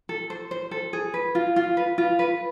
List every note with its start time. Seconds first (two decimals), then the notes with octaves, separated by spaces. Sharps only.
0.09 A4
0.30 C5
0.51 C5
0.71 A4
0.93 G#4
1.14 B4
1.35 F4
1.56 F4
1.77 B4
1.98 F4
2.19 B4